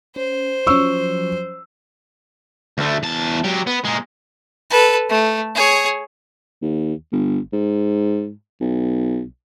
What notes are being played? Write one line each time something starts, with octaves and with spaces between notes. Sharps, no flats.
C#4 C5
F3 F#3 C#4 C#6 E6
D2 A3
E2 A5
F#3 G4
B3
A#2 G#3
A4 B4
A3
G#4 C#5
D#2
G1
G#2
B1